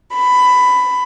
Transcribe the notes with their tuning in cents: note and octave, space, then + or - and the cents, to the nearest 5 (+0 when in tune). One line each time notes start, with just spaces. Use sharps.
B5 +15